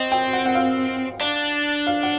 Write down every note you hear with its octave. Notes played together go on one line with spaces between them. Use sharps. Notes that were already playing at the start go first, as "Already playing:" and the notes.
Already playing: C4 D#5
G5
F#5
F#5
F5
D4
F5
F#5